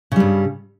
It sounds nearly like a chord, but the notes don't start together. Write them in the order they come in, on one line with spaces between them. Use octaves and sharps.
C#3 G3 G2